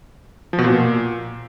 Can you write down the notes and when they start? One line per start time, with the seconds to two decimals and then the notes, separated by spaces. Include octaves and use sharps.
0.53 F3
0.58 B2
0.64 A#2